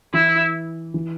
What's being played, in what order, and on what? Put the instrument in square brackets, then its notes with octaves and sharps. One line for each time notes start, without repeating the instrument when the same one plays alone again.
[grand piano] E3 [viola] E4
[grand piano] E3